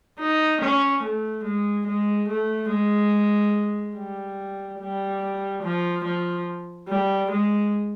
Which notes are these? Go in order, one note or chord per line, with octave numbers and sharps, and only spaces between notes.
D#4
C#4
A3
G#3
G#3
A3
G#3
G3
G3
F3
F3
G3
G#3